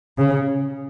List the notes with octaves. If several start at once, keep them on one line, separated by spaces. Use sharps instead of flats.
C#3